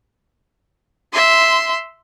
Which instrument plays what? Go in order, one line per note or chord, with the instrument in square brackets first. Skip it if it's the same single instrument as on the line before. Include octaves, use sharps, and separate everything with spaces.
[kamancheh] E5 C6